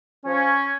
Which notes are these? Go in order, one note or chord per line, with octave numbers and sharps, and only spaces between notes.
F3 C#4